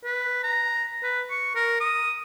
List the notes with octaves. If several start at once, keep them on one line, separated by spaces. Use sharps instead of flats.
B4
A#5
B4
C#6
A#4
D#6